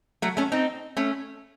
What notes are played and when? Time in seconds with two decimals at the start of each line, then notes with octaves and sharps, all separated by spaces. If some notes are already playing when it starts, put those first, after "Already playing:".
0.22 F#3 A3
0.37 A3 C#4
0.52 C4 D#4
0.97 A3 C#4